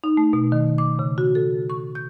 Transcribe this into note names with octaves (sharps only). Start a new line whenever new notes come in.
D#4
A3
B2
D#3
D6
C#3
F#4
A4
C#6
G6